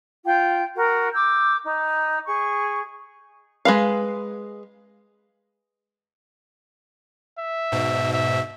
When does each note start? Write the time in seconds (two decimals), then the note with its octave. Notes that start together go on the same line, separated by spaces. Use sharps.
0.24 F4 G5
0.75 F#4 A#4
1.12 D6 E6 G6
1.62 D#4
2.25 G#4 C#6
3.65 G#3 B4 F5
7.38 E5
7.72 G#2 B2
8.14 E5